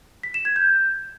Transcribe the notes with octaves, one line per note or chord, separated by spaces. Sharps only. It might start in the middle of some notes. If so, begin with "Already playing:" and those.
B6
E7
G#6
G6